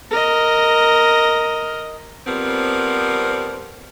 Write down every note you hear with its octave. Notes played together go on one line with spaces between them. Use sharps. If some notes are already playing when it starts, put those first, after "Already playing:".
A#4 D#5
F2 F3 G3 B3 C4 A#4